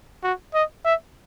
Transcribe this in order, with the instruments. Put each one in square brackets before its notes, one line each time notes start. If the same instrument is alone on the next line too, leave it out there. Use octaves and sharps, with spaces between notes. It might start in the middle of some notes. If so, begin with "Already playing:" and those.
[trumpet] F#4
D#5
E5